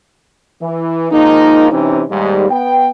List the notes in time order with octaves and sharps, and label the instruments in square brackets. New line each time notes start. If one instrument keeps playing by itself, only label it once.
[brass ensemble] E3
D#3 F3 G#3 A#3 D#4
C3 E3 C#4 D#4
D#2 G#2 G3
B3 G5